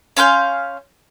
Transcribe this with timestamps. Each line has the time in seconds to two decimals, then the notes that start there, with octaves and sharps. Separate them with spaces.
0.17 C#4 F5 C6 G6